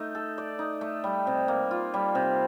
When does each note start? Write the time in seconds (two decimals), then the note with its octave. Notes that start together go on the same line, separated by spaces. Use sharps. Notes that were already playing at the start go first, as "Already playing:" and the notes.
Already playing: A3 D#4
0.15 A4
0.38 D5
0.59 D#4
0.81 A3
1.04 G3
1.27 C3
1.48 A#3
1.71 F4
1.94 G3
2.15 C3